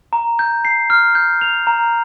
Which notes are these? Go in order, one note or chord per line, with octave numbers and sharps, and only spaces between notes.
A#5
G6
C7
F6
G6
F7
A#5